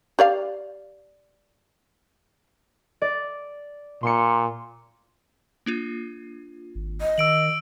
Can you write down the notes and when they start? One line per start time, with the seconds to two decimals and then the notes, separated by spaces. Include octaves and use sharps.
0.19 G4 D5 F5
3.02 D5
4.03 A#2 C6 C#7
5.66 A#3 D4 F4
6.75 G#1
7.01 D#5
7.18 D#3 E6 D7 F#7